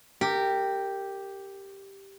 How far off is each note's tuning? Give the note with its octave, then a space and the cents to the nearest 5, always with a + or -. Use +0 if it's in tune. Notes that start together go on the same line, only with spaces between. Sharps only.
G4 +0 A#4 -20